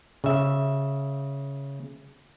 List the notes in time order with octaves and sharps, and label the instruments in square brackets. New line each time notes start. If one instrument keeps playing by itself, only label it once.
[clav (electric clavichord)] C#3 E5